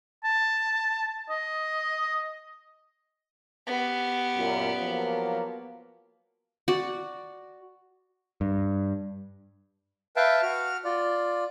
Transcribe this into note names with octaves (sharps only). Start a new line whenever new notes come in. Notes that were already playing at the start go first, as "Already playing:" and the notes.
A5
D#5
B3 G4
F#2 A#2
F3 F#3 A#3
F#4 D5
G2
B4 E5 F5 G5 A5
F#4 F6
F4 D5